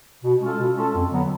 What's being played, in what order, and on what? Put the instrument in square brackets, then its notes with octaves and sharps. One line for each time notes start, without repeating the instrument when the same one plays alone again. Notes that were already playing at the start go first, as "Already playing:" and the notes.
[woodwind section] B2
G#3 C#4 F4 A4
B2
G#3 C#4 F4 A4
F2
D3 F#3 B3